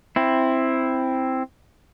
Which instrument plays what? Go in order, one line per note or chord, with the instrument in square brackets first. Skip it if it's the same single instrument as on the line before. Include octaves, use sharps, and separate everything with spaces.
[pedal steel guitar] C4 E4